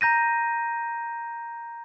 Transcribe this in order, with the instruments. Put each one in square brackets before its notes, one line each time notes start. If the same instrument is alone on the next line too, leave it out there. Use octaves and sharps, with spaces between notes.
[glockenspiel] A#5 G6 A#6 D#7